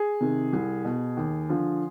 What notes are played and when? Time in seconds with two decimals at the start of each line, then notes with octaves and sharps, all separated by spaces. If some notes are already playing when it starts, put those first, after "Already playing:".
Already playing: G#4
0.20 C3 D#3
0.53 C2
0.85 B2
1.17 D#2
1.50 D3 F3